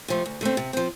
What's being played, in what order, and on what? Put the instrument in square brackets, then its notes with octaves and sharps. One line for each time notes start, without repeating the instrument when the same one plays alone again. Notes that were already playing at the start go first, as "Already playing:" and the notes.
[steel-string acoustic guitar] C3 F3 A3
D2
D3 A3 C4
C3
F3 C4